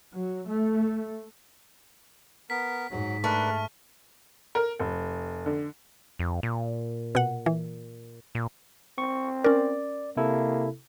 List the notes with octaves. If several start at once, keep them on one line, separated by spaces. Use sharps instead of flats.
F#3
A3
B3 A#4 B6
G#2 F#3
A3 D4 A#4 B4 C#6 F6
A#4
F1
D3
F2
A#2
B2 F#5
E3
A#2
C4 C#6
C#4 A#4 D5
C3 A#3 E4 A4